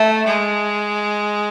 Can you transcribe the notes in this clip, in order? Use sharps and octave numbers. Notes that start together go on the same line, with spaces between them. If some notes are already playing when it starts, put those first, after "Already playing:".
Already playing: A3
G#3